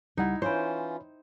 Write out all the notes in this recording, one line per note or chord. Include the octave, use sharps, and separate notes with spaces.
C#2 G3 D#4 E4 F#5
E3 C#4 F4 C5 C#5 G5 B5